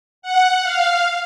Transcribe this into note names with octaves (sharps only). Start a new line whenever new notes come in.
F#5
F5